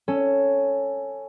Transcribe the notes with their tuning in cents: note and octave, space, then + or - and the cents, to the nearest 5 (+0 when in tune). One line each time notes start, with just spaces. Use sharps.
C#4 +0 A4 +10